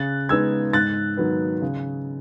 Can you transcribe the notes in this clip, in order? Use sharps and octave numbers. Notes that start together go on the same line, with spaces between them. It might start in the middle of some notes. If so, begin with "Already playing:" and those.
Already playing: C#3 F#6 A6
G#3 B3 D#4 E6 G#6
G#2 F#6 A6
D#3 F#3 B3
C#3